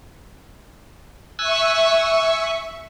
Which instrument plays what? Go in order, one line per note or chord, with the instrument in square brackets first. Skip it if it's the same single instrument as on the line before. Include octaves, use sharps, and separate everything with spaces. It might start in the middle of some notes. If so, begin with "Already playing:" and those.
[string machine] E5 C#6 [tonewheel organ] G#5 E6 F#6